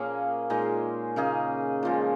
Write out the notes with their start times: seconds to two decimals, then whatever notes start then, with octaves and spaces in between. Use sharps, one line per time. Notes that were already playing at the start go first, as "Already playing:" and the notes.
Already playing: A#2 F3 A#3 C#4 F4 G#4
0.50 A#2 G#3 D#4 G#4
1.16 C#3 A#3 D#4 G#4
1.83 A#2 F3 G#3